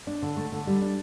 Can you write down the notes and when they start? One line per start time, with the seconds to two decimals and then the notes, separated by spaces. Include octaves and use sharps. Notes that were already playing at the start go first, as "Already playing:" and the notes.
0.07 D4
0.22 D3
0.37 A3
0.52 D3
0.67 G3
0.82 D4